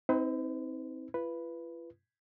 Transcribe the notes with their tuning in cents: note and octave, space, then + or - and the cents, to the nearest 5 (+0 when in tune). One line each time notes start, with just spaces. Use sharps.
C4 +0 D#4 +40 B4 +45
F4 -45 B4 +0